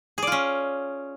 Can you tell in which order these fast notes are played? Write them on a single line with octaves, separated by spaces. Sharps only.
G#4 D5 F4 C#4